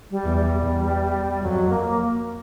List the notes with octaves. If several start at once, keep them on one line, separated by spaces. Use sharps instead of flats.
G3
E2
G3
E2
F2 F#3
A#3